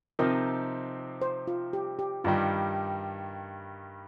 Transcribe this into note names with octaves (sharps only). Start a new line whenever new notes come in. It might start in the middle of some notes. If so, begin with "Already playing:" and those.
C3 F3 C4 D#4 A#4 D#5
C5
F4
G4
G4
G2 D#3 G3 F4